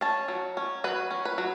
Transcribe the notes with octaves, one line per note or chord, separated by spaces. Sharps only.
C#4 A5
F#3
C#4
F#3 B4
C#4
B4
F#3